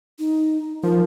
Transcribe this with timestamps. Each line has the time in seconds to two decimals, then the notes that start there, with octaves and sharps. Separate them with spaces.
0.19 D#4
0.84 F3 A#4